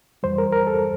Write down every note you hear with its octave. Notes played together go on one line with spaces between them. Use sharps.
F2 E3 G3 C5
A#4
A#4
A4